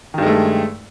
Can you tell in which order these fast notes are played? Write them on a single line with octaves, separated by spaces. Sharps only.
D#3 G2 G#3 A3